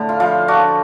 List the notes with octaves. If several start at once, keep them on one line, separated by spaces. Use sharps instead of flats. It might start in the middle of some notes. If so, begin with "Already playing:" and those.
Already playing: A2 D3
F4
F3 F4
D4 F#4